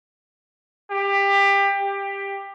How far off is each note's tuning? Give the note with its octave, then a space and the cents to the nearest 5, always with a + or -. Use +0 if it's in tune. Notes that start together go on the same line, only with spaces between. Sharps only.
G4 +20
G4 +15